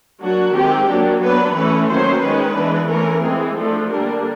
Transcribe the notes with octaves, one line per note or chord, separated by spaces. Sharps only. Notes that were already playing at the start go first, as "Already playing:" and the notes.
F#3 A#3 D4 F#4
D#3 G#3 C4 G4
F#3 A#3 D4
F#3 B3 D4 B4
E3 A3 C#4 B4
D#3 F#3 A#3 C#4 C5
D#3 G#3 C#4 B4
E3 G#3 B3 D4
E3 A3 C#4 A#4
E3 G#3 C4 G#4
F3 A3 D4 A4
D3 G3 A#3 D4 A#4